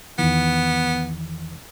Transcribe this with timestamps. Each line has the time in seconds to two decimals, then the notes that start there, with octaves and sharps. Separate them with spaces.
0.19 E2 D#3 E3 B3